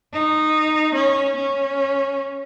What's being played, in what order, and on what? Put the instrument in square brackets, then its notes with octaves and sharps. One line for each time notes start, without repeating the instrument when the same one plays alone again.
[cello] D#4
C#4
C#4